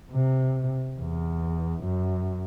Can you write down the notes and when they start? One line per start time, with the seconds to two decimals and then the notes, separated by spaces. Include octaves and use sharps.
0.11 C3
1.00 E2
1.84 F#2